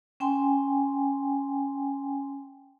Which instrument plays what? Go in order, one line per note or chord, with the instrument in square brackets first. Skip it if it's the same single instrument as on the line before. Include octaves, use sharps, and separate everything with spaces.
[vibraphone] C#4 G5 G#5 C6